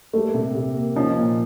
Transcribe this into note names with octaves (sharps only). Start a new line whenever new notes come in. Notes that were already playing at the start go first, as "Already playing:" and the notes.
G3 A3 A#3
C3
C3
A#3
F3 C#4 D#4
A#2